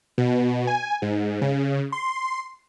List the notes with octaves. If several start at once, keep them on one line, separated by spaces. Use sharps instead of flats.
B2
G#5
G#2
C#3
C6